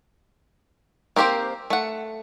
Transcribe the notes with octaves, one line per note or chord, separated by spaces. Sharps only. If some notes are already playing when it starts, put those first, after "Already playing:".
A#3 C4 G4 A#4 C5
A3 F#5